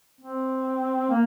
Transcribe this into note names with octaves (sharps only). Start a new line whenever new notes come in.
C4
A#3